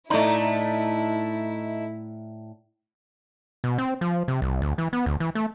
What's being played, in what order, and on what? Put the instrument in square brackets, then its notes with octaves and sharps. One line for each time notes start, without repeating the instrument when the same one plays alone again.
[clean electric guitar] A2 D5 A#5 [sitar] A3 D#4 [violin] E4
[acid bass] B2
C4
F3
C3
C2
D2
E3
B3
D2
E3
A3